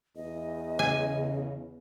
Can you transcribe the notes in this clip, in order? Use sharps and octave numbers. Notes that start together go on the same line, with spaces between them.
E2 D#5
C#3 G#5